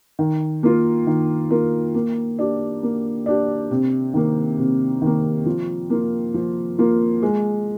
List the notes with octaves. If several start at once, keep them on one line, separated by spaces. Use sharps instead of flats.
D#3
A#3 F4 A#4
D#3
A#3 F4 A#4
A#3
D4 G4 D5
A#3
D4 G4 D5
C3
D#3 A#3
C3
D#3 A#3
F3
A#3 F4
F3
A#3 F4
G#3